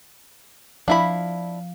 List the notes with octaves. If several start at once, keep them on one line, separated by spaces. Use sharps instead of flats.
F3 D4 E4 F5 B5